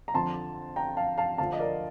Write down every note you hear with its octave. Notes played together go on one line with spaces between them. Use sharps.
A#5
F2 D3 F3 A5 C6
G5 A#5
F5 A5
F5 A5
D2 D3 F3 F5 A5
D#5
A#4 D5